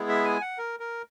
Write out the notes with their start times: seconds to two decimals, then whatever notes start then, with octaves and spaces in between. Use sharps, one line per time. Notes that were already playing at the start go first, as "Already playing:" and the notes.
Already playing: G#3 B3 E4 G#4
0.09 E5
0.25 G#5
0.41 F#5
0.58 A#4
0.80 A#4